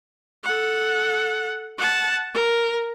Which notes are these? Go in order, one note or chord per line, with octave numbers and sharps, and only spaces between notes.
A4 F#5
F#5 A5
A#4